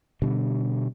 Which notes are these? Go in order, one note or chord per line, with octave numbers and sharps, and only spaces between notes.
B2 D3 G3